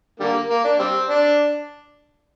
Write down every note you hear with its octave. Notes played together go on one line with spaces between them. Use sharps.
D3 G3 A#3
A#3
D4
G3 C4
D4